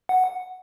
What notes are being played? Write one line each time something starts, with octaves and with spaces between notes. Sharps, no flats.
F#5